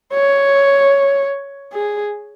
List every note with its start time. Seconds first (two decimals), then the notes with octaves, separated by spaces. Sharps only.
0.14 C#5
1.73 G#4